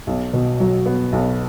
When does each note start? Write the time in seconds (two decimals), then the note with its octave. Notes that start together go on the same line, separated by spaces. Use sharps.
0.07 B1
0.33 B2
0.60 F#3
0.86 B3
1.13 B1